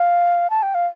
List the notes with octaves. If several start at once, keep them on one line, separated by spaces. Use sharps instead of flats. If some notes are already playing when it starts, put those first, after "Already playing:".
Already playing: F5
A5
G5
F5